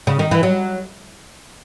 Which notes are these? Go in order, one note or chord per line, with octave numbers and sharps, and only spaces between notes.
C#3
D#3
E3
F#3